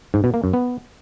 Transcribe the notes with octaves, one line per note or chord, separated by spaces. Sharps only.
G#2
B2
A#3
F#2
B3